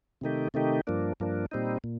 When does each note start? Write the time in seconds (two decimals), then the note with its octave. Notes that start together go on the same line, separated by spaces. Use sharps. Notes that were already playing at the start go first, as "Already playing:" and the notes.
0.21 C3 D#3 A3 D#4 G4
0.54 C3 D#3 A3 D#4 G4
0.87 G2 F3 A#3 D4
1.20 G2 F3 A#3 D4
1.51 A#2 G3 C4 D#4
1.84 A#2